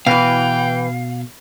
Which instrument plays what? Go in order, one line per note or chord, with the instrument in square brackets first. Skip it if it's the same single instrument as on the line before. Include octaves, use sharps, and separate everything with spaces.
[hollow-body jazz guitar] B2 [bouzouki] E3 B4 [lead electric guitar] F5 [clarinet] G5